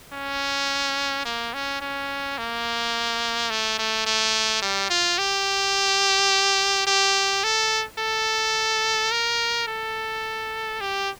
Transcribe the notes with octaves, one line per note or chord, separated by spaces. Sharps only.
C#4
A#3
C#4
C#4
A#3
A3
A3
A3
G3
F4
G4
G4
A4
A4
A#4
A4
G4